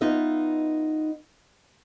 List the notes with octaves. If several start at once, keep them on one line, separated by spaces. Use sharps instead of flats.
B3 D#4 F4 D#5 E5